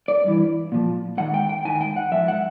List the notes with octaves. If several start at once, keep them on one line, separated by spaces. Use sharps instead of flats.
D5
G2 E3
A#2 F3
G#2 D#3 F#5
G5
G5
G#2 D#3 G#5
G5
F#5
G#2 F3 E5
F#5